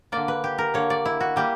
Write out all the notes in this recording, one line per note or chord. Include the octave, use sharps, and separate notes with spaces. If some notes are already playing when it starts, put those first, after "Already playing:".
D3 A#3 D5
B4
G4
A#4
D3 A#3 C#5
D5
E4
F#4
G3 A#3 G4